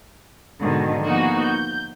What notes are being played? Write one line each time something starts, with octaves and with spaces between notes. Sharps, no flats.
G#2 B2 D3 D#3
F3 A#3 B3 D#4 F#4 G#4
G6